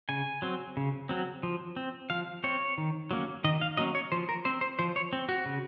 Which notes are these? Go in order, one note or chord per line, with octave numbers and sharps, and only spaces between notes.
C#3 G#5
F#3 C4
C#3
F#3 C4
F3
C4
F3 F5
C4 C#5
D#3
F#3 A#3 C#4
D#3 D#5
F5
F#3 A#3 C#4 D#5
C#5
F3 C5
A#4
C4 C5
C5
F3 C5
C#5
C4
F#4
C#3